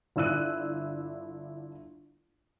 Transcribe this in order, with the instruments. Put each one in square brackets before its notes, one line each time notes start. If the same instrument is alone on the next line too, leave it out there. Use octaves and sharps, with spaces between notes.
[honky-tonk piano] G1 D4 E4 E6 F#6 D#7